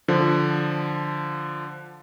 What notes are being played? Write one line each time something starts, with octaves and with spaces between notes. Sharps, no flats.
D3 F3